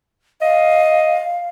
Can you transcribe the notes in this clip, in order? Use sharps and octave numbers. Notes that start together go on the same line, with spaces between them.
D#5 F5